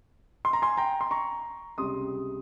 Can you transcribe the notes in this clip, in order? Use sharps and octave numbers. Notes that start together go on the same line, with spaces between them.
C6
A#5
G#5 C6
G5 A#5
C6
A#5 C#6
C#2 C3 G3 C6 D#6